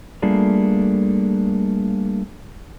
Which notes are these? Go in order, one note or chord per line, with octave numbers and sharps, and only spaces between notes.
G3 A3 A#3 D4 F4 G#4